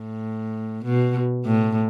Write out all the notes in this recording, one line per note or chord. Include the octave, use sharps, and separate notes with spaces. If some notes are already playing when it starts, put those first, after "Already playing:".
Already playing: A2
B2
A2